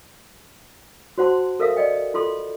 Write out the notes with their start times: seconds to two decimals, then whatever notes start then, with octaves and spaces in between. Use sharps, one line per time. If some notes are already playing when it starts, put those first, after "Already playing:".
1.18 F#4 C5 F#5 A5 C6
1.60 A4 A#4 E5 F5 D#6
1.77 D5 D#5 G5
2.14 F4 A4 C6